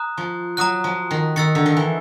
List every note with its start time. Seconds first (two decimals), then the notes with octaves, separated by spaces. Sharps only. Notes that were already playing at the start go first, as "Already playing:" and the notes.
Already playing: A#5 D#6 F#6
0.17 F3
0.57 F#3 A#5 D#6 F#6
0.84 F3
1.11 D#3
1.36 D#3 E6 A6 C#7
1.55 D3
1.66 D#3
1.77 E3